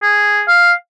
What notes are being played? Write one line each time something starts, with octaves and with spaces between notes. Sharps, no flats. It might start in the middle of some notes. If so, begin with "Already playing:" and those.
G#4
F5